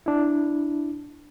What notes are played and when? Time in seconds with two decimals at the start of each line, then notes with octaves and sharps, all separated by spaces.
0.06 D4 E4